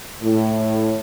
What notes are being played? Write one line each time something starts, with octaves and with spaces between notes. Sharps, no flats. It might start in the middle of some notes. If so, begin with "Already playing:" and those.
A2